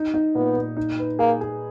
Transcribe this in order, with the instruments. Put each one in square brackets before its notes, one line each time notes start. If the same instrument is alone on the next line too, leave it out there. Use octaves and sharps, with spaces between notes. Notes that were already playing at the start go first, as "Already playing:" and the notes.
Already playing: [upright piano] D#4
D#4
[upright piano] A#2 [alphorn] B3
[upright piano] A#2
D#4
B4
[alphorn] A#3 [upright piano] G#4
[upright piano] G#4